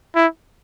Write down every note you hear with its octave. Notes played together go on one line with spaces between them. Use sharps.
E4